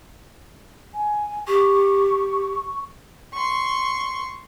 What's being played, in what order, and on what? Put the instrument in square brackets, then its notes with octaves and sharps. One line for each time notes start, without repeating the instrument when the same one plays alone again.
[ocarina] G#5
[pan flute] G4 [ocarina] C#6
[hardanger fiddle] C6 C#6